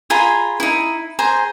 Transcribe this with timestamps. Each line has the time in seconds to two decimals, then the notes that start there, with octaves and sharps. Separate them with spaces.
0.10 F4 G#4 A#5 B5
0.60 D#4 E4
1.19 G#4 C5 A#5